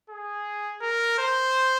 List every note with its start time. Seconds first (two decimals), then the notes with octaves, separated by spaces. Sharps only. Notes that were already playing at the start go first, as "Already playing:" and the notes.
0.10 G#4
0.81 A#4
1.19 C5